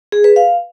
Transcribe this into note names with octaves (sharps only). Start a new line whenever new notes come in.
G#4
B4
F5